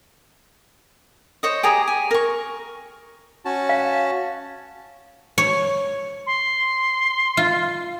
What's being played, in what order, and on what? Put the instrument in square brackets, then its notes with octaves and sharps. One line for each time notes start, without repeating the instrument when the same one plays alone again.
[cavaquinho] C5 C#5 D#5
G4 G#4 A#5 D#6
G#5
A#4 C#6
[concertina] C#4 F#4 A5
[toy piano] F5
[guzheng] C#5
[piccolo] C6
[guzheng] F4